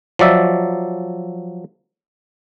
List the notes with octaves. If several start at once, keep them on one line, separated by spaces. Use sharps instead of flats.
F3 F#3 D5 E5